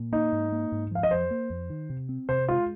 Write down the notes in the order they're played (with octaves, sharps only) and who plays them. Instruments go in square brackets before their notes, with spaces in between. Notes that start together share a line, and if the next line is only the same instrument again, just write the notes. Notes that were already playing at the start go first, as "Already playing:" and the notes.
Already playing: [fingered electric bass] A#2
[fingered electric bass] A#3 [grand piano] D#4
[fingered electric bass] G#2
A#3
G#2
[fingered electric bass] F3 [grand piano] F5
[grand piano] D#5
[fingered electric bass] F2 [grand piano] C5
[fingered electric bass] A#3
F2
D#3
C3
C4
[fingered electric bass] C3 [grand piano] C5
[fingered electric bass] G#3 [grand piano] F4